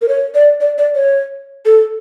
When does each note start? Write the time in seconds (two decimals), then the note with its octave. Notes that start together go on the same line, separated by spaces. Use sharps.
0.02 A#4
0.08 C#5
0.35 D5
0.61 D5
0.78 D5
0.95 C#5
1.66 A4